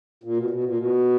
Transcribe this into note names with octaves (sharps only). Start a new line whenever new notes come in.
A#2
B2
B2
A#2
B2